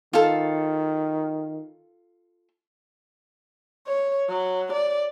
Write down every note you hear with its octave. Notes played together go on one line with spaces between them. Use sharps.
D#3 F4 A4
C#5
F#3
D5